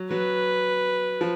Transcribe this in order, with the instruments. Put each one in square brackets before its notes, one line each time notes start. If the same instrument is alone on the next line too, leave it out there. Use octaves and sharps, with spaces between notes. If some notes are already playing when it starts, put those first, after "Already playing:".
Already playing: [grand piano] F#3
[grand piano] F#3 [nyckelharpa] B4
[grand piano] F3